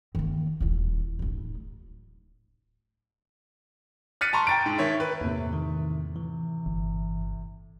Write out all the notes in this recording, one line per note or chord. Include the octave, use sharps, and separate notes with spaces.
D#3 A#3
D#1 E4
D1 D#4
F6 F#6 A6 B6 C#7 D#7
A5 A#5 C6 C#6
G5 A6 D7
G#2
D#3 C#5 E5
B4
E2 A2 C3 A#3
D#3
E3
G1